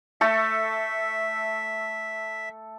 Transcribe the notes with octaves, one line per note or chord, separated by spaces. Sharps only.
A3 A4 E5